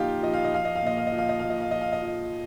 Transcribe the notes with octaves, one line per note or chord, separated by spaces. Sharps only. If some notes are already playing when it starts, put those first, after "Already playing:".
Already playing: A#2 F3 D#4 F4 G4
F3 D#5
F5
D#5
F3 F5
D#5
F5
A#2 D#5
F5
D#5
F3
F5
D#5
A#2 F5
D#5
F5
F3 D#5
F5
D#5
F3